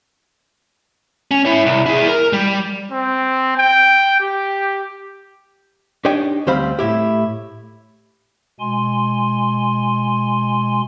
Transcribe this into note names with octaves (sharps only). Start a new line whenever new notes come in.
C#4
E4 C#5
C2
E4 G#4
A#4
G3
C4
G5
G4
D4 D#4 G4 C#5 D#5 G5
D2 G3 C4 C5 F5 B5
A2 E4 G4
B2 G#3 G#5 C6